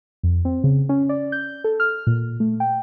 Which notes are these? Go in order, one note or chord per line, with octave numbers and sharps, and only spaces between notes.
F2
C4
C#3
C#4
D5
G6
A4
F6
A#2
A3
G5